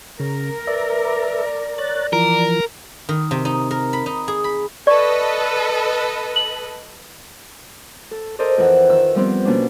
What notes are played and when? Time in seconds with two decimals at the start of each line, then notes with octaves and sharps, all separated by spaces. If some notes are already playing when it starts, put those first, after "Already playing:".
0.20 C#3 A#4
0.67 B4 D5 E5 A#5
1.78 C#5 F#6 A6
2.13 E3 F3 A#4
3.09 D#3
3.31 C3
3.45 D#4
3.71 A#4
3.93 B5
4.06 D#4
4.28 G#4
4.44 B5
4.87 A4 B4 D5 D#5 C#6
6.36 F#7
8.11 A4
8.39 A4 A#4 C5 D5 D#5
8.57 F2 E3 A#4 F#5 E6
8.89 D#3 E6
9.15 F3 G3 B3 C4
9.45 B2 A#3 C#4 D4